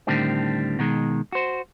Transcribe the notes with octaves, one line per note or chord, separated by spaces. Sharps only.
A2 D3 D#3 G3 C4
B2 D#3 G#3
F#4 C5